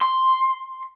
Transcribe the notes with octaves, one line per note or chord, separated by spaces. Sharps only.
C6